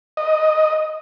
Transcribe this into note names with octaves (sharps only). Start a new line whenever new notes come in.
D#5